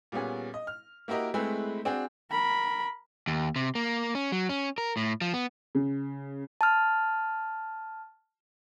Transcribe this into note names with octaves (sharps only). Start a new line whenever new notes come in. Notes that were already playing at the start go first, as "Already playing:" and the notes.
A#2 G3 B3 C#4 G#4
D#5
F6
A#3 E4 F#4 G4 A#4 D#5
G#3 A3 C4 E4 G#4 B4
C4 D4 F#4 G#4
A#4 B5
D#2
C3
A#3
C#4
F#3
C#4
A#4
A2
F3
B3
C#3
A5 F6